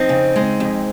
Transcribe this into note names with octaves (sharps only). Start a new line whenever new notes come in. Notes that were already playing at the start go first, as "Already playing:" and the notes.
Already playing: F2 C4 D#4
C#3
G#3
F2